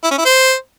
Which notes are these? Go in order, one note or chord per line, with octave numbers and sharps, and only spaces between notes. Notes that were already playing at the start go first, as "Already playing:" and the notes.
E4
C#4
E4
C5